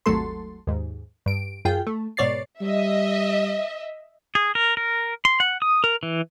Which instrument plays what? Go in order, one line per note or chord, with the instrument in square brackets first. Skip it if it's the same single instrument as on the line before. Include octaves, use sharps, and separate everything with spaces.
[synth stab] G#1 D#2 F#3 A3 A4 C6
D#2 G#2
G2 D7
F#2 F4 G#4 G5
A3
G#2 B2 C#5 D5 A6 C7
[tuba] G3 [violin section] D#5 E5
[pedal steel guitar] G#4
A#4
A#4
C6
F#5
D#6
A#4
E3